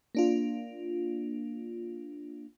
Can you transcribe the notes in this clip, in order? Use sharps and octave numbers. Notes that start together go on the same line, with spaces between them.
A#3 D4 F4